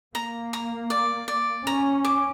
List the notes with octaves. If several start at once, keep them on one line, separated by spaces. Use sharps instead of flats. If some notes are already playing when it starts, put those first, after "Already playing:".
A#3 A#5
A#5
D5
D5
C#4 A#5
D6